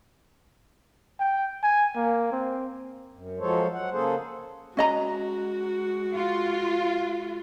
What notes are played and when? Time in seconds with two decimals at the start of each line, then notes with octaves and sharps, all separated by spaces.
1.20 G5
1.63 G#5
1.96 A#3
2.32 C4
3.12 F#2
3.40 F3 F#3 G#3 A4 C5 C#5
3.73 F#3 F#5
3.92 C#3 A#3 G#4 A4 C5
4.77 G#3 C#4 F#4 D#5 A#5
6.14 F4